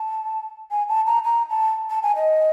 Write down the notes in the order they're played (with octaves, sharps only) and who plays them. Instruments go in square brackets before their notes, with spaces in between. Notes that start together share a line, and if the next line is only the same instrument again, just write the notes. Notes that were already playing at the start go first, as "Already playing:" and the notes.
Already playing: [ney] A5
G#5
A5
A#5
A#5
A5
A5
G#5
D#5